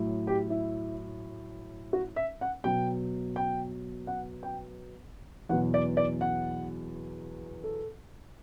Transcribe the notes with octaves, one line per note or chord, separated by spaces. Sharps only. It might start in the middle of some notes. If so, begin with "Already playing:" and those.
Already playing: A2 F#3
G4
E4
F#4
E5
F#5
B2 F#3 G5
G5
F#5
G5
E2 B2 F#3 F#5
D5
D5
F#5
A4